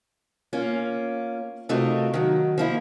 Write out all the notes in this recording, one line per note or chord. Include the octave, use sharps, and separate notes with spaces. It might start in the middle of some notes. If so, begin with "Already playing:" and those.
A#3 C#4 F4
C3 A3 D#4 F4 F#4 A#4
D#3 F#3
F3 A#3 E4